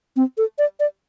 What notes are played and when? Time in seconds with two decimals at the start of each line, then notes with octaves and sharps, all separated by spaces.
0.16 C4
0.38 A4
0.58 D5
0.80 D5